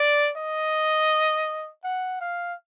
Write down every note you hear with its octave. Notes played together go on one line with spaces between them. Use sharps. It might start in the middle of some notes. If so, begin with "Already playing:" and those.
Already playing: D5
D#5
F#5
F5